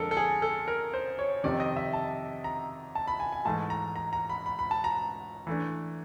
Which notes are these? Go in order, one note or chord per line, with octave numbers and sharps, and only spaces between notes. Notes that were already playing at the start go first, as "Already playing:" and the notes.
Already playing: F2 D3 F3 G#3 A4 A#4
A4
G#4
A4
A#4
C5
C#5
F2 C3 D#3 D5
D#5
E5
A5
A#5
A5
B5
G#5
G#5
G#2 E3 A3 A5
A#5
A#5
A#5
B5
B5
B5
A5
A#5
E3 A3 D4